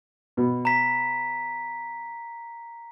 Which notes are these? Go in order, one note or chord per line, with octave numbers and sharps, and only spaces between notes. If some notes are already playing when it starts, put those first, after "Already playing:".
B2
A#5 B6